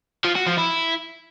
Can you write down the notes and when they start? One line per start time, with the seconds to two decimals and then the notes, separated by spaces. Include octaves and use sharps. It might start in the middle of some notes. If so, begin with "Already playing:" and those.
0.25 F3
0.36 F#4
0.47 F3
0.58 E4